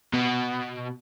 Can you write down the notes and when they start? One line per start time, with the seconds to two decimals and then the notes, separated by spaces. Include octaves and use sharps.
0.14 B2